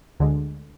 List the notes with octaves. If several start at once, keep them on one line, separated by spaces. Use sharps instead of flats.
D2 D3 G#3